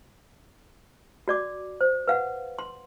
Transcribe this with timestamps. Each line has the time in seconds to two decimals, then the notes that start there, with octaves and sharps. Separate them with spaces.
1.28 F#4 D5 D6
1.81 C5
2.08 B4 F5 F#5
2.59 C6